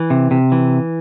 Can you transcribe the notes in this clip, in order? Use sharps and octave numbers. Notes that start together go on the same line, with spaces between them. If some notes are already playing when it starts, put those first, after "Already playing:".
Already playing: E3
C3
C3
E3